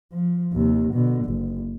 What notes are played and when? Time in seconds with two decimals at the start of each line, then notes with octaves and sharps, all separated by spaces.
0.13 F3
0.53 D#2 C3
0.93 B2 D3
1.25 F#1